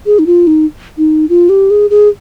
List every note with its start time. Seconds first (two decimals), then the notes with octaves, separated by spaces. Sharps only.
0.06 G#4
0.19 D#4
0.26 F4
0.47 D#4
0.98 D#4
1.29 F4
1.49 G4
1.70 G#4
1.90 G#4